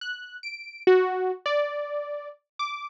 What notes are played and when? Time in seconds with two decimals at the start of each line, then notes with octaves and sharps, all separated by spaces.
0.01 F#6
0.43 D7
0.87 F#4
1.46 D5
2.59 D6